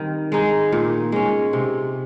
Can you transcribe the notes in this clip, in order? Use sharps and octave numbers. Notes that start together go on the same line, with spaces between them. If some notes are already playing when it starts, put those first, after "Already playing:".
Already playing: D#3 G3 C4
G#3 D#4 G#4
A#2
G#3 C#4
C3